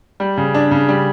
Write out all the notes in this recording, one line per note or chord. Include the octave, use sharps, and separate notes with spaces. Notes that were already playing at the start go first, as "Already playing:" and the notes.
G3
C#3
D4
C#3
G3